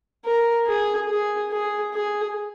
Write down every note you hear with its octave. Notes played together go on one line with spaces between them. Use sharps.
A#4
G#4
G#4
G#4
G#4